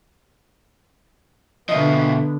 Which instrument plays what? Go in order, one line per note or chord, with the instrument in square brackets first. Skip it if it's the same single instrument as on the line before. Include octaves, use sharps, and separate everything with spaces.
[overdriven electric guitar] B2 F3 [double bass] D3 B3 [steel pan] D#5 [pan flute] E5